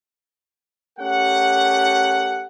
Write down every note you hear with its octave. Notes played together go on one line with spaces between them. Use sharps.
A3 C#4 G4 A#4 F#5